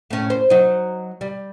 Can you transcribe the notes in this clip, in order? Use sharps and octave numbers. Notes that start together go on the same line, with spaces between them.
A2 C#4
C5
F#3 D#4
G3